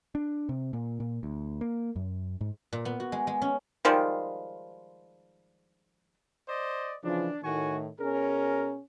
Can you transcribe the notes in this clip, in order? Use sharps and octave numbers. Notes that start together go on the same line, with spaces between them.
D4
C3
A#2
A#2
D2
A#3
F#2
G#2
A#2
B3
F#4
G#3
G#3
C#4
D#3 F3 G3 G#3
C5 D5 D#5
C#3 E3 F3 D4
A2 D#3 F#4 G#5 C#6
B2 C#4 G#4 A#4